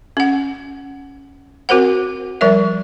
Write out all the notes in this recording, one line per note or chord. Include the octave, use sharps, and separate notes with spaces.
C#4 F#5
C4 F#4 A#4 C5 F#5
F3 G3 A#4 E5